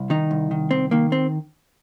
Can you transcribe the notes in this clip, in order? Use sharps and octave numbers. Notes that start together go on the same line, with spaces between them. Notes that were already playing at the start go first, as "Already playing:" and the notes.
Already playing: C2
D#3 D#4
C2
D#3
C2 C4
D#3 A#3
C4